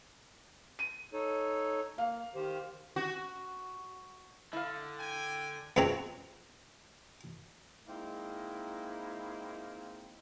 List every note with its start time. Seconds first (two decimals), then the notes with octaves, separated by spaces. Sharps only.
0.79 D#7
1.13 D#4 A4 C#5
1.98 A#3 F5
2.35 D#3 G4 C5
2.96 F#4
4.53 D3 E4 F5
4.99 G5 G#5
5.76 C#2 F#2 B2 C4 C#5 A#5
7.87 G#3 A#3 C4 D#4 E4